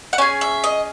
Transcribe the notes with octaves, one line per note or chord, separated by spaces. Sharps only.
F#5
C#4 G#4 G#5
E5
D#5